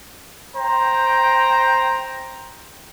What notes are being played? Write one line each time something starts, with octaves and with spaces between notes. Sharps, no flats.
C5 G5 A#5